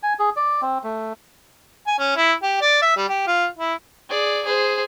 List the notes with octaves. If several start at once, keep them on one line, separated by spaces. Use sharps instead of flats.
G#5
G#4
D5
C4
A3
G#5
C#4
E4
G4
D5
E5
G3
G4
F4
E4
G#4 D5
G#4 C5